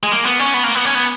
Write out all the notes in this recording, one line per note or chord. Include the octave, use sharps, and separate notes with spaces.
G#3
A#3
B3
C#4
B3
A#3
B3
C#4
B3